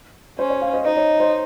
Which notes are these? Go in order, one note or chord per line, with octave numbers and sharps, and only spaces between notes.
C#4 C5
C#5
C#5 F5
C5 D#5
D#4 C5 D#5
C#5
C5